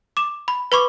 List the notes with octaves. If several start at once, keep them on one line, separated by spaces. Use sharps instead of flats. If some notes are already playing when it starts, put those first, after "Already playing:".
D6 E7
B5
B4 B5 C#6 D6